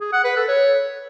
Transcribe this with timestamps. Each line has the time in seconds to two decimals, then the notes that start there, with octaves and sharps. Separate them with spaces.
0.01 G#4
0.13 F#5
0.24 B4
0.36 A4
0.48 C#5